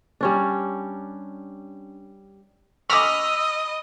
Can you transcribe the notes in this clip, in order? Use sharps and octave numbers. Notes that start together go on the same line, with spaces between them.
G3 C#4 D4
D#5 B5 C#6 D6 E6 F6 A#6